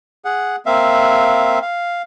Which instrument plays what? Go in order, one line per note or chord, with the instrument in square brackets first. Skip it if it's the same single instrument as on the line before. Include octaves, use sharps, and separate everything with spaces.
[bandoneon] G#4 F#5
A#3 C4 E5 F5
F5